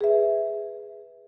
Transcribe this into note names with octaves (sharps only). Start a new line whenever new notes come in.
G#4 B4 E5